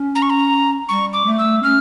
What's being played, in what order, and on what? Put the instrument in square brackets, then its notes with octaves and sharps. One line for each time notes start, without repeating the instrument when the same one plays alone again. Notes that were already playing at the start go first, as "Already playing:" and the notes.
Already playing: [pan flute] C#4
[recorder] A#5
C#6
A#5
[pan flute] G3 [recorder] C#6
[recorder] D6
[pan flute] A3
[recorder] E6
[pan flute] C#4 [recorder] F6